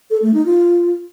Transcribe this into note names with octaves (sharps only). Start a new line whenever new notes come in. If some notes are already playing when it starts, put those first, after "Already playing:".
A4
A3
D#4
F4